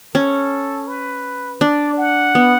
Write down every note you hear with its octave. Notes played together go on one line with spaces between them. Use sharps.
C#4 A4
B4
D4 D5
F#5
B3